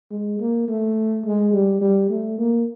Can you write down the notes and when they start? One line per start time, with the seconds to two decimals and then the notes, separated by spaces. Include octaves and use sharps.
0.11 G#3
0.40 A#3
0.68 A3
1.25 G#3
1.53 G3
1.81 G3
2.10 A3
2.38 A#3